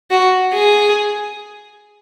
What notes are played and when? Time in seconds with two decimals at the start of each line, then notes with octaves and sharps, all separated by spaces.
0.11 F#4
0.54 G#4